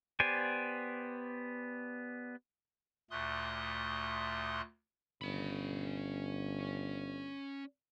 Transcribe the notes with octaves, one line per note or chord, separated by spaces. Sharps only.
B3 G4 C5 D5 G#5
D2 A#2 A3 C6 D#6 F#6
G1 C#4 B5